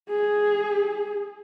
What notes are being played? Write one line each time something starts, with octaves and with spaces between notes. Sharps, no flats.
G#4